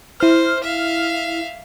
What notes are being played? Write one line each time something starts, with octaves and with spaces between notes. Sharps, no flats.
E4 C5 F6
E5 F5